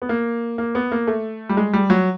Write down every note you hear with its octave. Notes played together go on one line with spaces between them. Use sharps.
B3
A#3
A#3
B3
A#3
A3
G3
G#3
G3
F#3